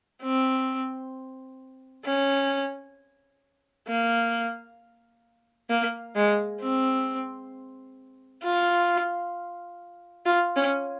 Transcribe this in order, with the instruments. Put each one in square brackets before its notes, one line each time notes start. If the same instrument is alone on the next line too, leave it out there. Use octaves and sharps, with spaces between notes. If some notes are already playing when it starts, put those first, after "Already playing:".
[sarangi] C4
C#4
A#3
A#3
G#3
C4
F4
F4
C#4